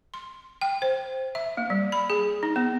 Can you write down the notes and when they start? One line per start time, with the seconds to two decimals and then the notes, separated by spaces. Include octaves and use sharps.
0.14 C6
0.61 G5
0.82 C5
1.35 E5
1.57 A#3
1.70 G3
1.92 B5
2.10 G#4
2.43 D#4
2.56 B3